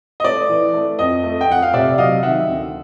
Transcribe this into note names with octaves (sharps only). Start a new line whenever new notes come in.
D#5
A3 D5
E3
A3
F2 D#5
A3
G5
F2 F#5
F5
C3 D5 E5
F#3 D#5 F5
D#3 E5 F#5
D2